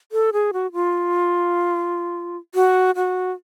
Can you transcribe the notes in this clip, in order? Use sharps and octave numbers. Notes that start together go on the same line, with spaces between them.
A4
G#4
F#4
F4
F#4
F#4